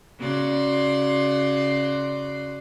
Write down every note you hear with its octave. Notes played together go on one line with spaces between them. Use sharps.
C#3 F#4 D5 C6